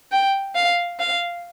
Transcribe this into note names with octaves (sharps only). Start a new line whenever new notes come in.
G5
F5
F5